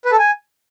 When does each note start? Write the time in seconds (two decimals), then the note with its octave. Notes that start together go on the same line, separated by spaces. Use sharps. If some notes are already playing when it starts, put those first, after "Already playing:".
0.05 B4
0.12 A4
0.19 G#5